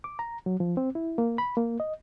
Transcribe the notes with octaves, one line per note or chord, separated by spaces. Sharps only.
D6
A#5
F#3
F3
C4
E4
A#3
B5
A#3
D#5